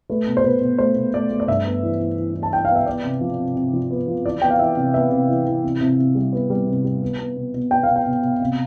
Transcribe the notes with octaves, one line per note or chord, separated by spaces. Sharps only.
A3 B4
B2
C5
B2 B4
B2
A3 C5
B2
A3 D5
A3
D5
G2 E5
B3
E3
E3
E3
E3
A5
E3 G5
B3 F5
E5
B3 D5
C3
F3
C3
C3
F3
B3
F3
E3 D5
B3 G5
F5
E3 E5
C3
B3 E5
C3
E3
E3
C3
C3
C3
G3
B3
G3
C3
G3
B3
B3
B2
B2
B3 G5
F5
B2
G5
B2
B2
C3